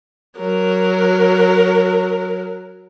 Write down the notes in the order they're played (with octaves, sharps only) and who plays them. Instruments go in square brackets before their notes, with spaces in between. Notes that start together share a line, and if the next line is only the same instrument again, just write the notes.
[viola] F#3 A#4